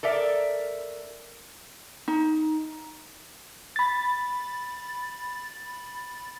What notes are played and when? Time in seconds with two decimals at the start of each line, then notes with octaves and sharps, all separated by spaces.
0.03 A4 A#4 D5 E5
2.08 D#4
3.76 B5 A6